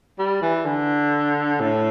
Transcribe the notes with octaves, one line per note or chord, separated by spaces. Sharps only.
G3
E3
D3
A2